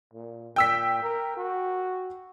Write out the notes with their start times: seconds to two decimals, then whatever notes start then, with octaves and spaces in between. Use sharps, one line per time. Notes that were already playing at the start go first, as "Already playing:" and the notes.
0.14 A#2
0.56 A#2 G5 E6 B6
1.02 A#4
1.37 F#4